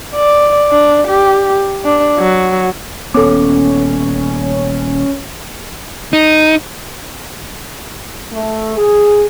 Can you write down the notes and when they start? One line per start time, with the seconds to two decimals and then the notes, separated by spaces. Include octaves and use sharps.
0.15 D5
0.71 D4
1.07 G4
1.84 D4
2.19 F#3
3.14 D#1 B3 C#4 A4 D6
6.13 D#4
8.32 A3
8.76 G#4